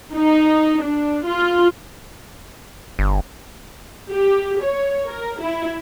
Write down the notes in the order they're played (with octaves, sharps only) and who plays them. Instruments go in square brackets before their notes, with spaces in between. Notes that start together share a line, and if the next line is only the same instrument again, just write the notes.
[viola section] D#4
D4
F4
[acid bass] G1
[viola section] G4
C#5
A#4
E4